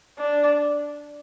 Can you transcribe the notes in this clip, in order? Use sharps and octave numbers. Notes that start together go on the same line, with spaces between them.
D4